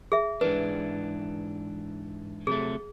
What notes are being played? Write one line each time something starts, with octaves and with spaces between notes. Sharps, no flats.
G#4 E5
G#2 E3 D4 B4
C3 F#3 A3 G#4